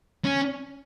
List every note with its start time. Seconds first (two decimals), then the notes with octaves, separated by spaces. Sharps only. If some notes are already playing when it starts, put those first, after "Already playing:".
0.25 C#4